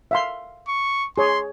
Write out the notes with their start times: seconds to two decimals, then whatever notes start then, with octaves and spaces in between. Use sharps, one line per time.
0.11 E5 F5 C6
0.68 C#6
1.18 G#4 C#5 C6